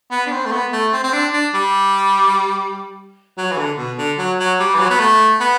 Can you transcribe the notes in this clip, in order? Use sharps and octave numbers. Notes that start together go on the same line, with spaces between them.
B3
D4
C4
A3
B3
A3
C4
C4
D4
D4
G3
F#3
E3
D3
B2
D3
F#3
F#3
G3
E3
F#3
B3
A3
B3